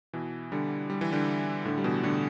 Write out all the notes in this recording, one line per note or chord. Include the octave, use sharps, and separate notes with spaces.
B2 E3
D3 G3
G3
E3
D3 G3
A2 D3
G3
B2 E3
A2 D3